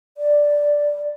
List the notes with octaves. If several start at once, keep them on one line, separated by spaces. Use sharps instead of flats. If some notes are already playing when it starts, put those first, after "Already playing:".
D5